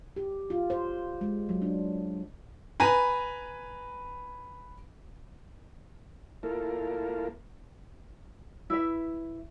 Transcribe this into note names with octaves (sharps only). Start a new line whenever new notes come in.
G4
F4
C5
G#3
F#3
D4
B4 G#5 A#5 B5
A#3 E4 F4 A4 A#4
E4 B4 E5